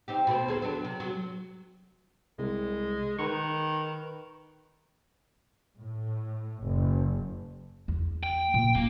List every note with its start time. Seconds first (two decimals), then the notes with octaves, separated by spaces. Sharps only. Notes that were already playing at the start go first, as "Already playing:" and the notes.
0.08 C4 D#4 G4
0.27 B2 A3 C4
0.48 D#2 G#4 A4
0.62 F#3 B3 D4
0.84 C3
1.00 F#3
2.39 C2 G#3
3.19 D#3 B4 C#6
5.78 A2
6.63 F#1
7.88 E2
8.24 G5
8.54 A#2
8.75 F#3 A#3 C#4